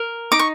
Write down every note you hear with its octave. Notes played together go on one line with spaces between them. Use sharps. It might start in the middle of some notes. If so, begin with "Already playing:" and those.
Already playing: A#4
D#4 D6
C#6